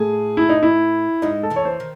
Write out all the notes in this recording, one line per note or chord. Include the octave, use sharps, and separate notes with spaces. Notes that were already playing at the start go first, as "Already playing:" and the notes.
Already playing: A2 A3 G#4
E4
D#4
E4
G#2 G#3 D#4
A4
E2 E3
C#5
C5
D#3